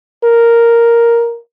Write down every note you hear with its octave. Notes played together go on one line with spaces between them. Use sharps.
A#4